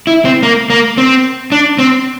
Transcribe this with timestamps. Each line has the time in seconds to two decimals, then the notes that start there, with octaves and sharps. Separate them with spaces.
0.07 E4
0.25 C4
0.43 A#3
0.70 A#3
0.98 C4
1.52 D4
1.79 C4